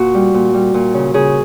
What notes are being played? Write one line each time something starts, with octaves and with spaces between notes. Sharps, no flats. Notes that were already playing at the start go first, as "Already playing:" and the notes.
Already playing: A#2 F#4
G3
A#2
G3
A#2
C#3
C#3 G#4